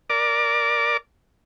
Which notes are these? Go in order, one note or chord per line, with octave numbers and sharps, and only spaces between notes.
A#4 D5 D6